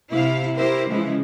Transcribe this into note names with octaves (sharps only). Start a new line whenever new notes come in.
C3 E4 F5
E4 G4 A#4 C5
C#3 E3 F3 G#3 E4